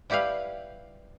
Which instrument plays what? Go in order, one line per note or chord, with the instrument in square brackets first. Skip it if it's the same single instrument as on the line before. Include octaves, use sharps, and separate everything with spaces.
[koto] G3 E4 G4 B4 F5